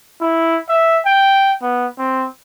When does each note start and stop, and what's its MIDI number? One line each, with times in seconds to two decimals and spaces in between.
0.21 0.59 64
0.69 1.00 76
1.05 1.52 79
1.62 1.87 59
1.99 2.27 60